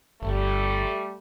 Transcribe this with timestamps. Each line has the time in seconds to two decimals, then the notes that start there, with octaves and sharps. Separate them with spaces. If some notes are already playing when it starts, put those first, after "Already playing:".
0.22 G1 G3 A3